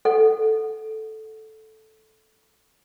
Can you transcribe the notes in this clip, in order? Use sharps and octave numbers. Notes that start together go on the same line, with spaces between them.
A4 F#5